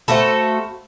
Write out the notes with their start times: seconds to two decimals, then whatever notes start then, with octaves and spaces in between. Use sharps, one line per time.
0.08 A3 F#4 A4 C5 F5 B5